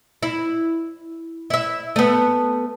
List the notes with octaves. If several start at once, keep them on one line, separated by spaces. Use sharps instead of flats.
E4
E4 E5
A3 B3